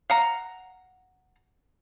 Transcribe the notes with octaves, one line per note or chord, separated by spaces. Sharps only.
F5 F#5 A#5